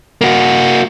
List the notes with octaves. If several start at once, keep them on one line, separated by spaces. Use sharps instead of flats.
A#3 F#4